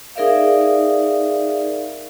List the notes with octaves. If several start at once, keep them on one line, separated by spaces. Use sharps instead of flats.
D#4 G#4 A#4 D5 E5 F5